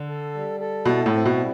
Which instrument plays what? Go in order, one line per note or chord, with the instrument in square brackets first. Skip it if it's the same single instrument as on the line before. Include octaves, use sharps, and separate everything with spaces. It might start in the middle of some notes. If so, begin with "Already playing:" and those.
Already playing: [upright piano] D3
[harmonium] A4
G3
A4
[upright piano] B2 [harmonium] E4
[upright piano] A2
[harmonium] C4
[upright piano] B2
[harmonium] G3